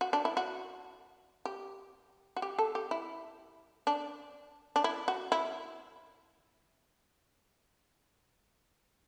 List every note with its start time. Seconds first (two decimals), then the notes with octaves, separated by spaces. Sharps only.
0.01 F#4
0.13 D4
0.25 E4
0.37 F#4
1.45 G4
2.37 F#4
2.42 G4
2.58 A4
2.75 G4
2.91 E4
3.87 D4
4.76 D4
4.84 E4
5.08 F#4
5.32 E4